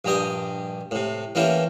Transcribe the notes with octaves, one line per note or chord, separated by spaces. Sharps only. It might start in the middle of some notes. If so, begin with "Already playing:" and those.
A#1 G2 G3 G4 D#5 G#5
A2 C3
E3 A3 A#3 C#4 E4 G4